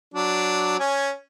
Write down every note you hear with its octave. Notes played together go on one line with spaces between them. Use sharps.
F#3 D4
C#4 G#5